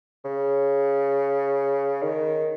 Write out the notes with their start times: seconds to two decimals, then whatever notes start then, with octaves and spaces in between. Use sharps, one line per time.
0.25 C#3
2.03 D#3